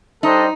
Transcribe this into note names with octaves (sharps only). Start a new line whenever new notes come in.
G3 D4 D#4 A4 C5 D#5